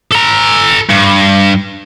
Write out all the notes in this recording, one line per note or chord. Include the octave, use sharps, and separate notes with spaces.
A4 A#5
G2